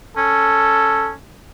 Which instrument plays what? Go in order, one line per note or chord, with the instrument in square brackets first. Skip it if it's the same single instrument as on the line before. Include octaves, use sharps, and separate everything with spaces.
[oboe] C#4 [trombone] A4